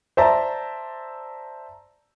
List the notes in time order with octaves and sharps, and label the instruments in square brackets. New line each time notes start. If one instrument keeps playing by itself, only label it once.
[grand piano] C5 D5 E5 A5 A#5